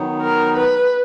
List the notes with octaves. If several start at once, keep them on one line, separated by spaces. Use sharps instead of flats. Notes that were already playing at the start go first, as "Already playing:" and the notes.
Already playing: D#3 F#3 B3 D#4
A#4
B4